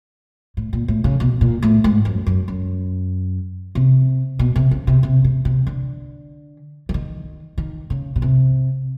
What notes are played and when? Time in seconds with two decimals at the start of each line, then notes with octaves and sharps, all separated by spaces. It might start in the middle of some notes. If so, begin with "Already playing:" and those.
0.57 A2
0.73 A#2
0.88 A2
1.04 C#3
1.20 B2
1.41 A#2
1.62 A2
1.84 G#2
2.05 F#2
2.26 F#2
2.48 F#2
3.75 C3
4.39 B2
4.56 C3
4.71 C#3
4.87 C3
5.03 C3
5.24 C3
5.45 C3
5.67 D3
6.89 E3
6.94 D#3
7.58 D#3
7.90 C#3
8.16 B2
8.22 C3